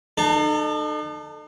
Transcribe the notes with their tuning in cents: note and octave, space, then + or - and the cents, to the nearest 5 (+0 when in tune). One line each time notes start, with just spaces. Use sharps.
D#4 -45 A4 +0